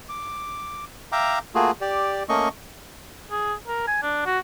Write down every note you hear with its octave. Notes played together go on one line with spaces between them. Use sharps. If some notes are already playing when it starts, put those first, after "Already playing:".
D6
E5 F5 G5 A#5 D6
A3 A#3 F4 F#4 G#4
G4 D5
A3 A#3 C#4 D#5 C#6
G#4
A#4
G#5
D4
F#4